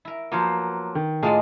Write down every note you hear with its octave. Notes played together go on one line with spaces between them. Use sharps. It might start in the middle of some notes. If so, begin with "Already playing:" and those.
E4 A#4
F3 F#3 A#3 B3
D#3
A2 G#3 A#3 D#4 F4 G#4 A5